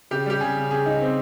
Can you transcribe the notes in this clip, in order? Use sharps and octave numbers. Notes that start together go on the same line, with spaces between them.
C#3 G4
G3 G4
C#3 G#4
C#3
C#3 G#4
D#4
C4